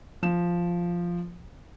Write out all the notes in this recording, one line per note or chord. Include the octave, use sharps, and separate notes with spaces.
F3 E7